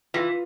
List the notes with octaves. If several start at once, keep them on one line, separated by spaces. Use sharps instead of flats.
E3 F4